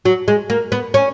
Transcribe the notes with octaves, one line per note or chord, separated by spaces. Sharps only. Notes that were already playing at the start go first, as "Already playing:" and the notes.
F#3
G#3
A#3
B3
C#4